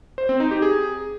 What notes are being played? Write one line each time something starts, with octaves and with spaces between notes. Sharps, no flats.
C5
C4
D#4
G4
G#4